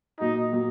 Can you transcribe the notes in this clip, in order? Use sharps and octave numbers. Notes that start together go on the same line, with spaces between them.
A#2 F#3 A#3 D#4 F#4
A#2 F#3 A#3 F#4